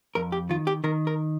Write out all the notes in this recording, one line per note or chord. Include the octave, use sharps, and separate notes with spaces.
F2 A#4
G4
D#3 F4
G4
D#3 A#4
A#4